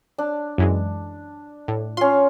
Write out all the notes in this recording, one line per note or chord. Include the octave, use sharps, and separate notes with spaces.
D4
F#2 E3 G#3
A2
C#4 F4 C6